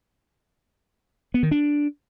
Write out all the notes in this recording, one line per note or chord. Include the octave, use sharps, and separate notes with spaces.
B3
D#3
D4